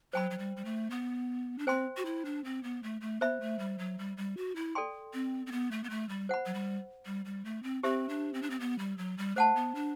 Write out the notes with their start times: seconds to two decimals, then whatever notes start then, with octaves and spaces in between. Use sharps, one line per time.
0.13 F#3 C5 G5 B5
0.31 F#3
0.38 G3
0.57 G3
0.65 A3
0.91 B3
1.58 D4
1.67 C4 C5 G5 C6
1.97 F#4
2.05 E4
2.25 D4
2.45 C4
2.63 B3
2.83 A3
3.01 A3
3.21 B3 C5 E5 B5
3.41 A3
3.59 G3
3.79 F#3
3.99 G3
4.17 G3
4.37 F#4
4.56 E4
4.75 A4 D5 G5 C6
5.13 C4
5.47 C4
5.52 B3
5.72 A3
5.84 B3
5.90 A3
6.09 G3
6.29 C5 F#5 B5
6.46 F#3
6.54 G3
7.06 G3
7.25 G3
7.45 A3
7.63 C4
7.83 C4 G4 C5 E5
8.09 D4
8.34 C4
8.42 D4
8.50 C4
8.60 B3
8.79 G3
8.98 F#3
9.18 G3
9.36 A3 C5 F#5 A5
9.55 B3
9.75 D4